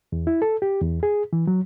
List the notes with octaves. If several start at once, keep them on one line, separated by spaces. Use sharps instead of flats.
E2
E4
A4
G4
E2
G#4
E3
F#3